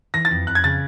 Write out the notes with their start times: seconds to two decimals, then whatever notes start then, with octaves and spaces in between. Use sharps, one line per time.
0.14 E3 A#6
0.25 A6
0.31 F2
0.47 F2 F#6
0.55 G#6
0.64 C#3 A6